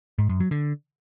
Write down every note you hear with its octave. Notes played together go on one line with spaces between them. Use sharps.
G#2
F#2
F#3
D3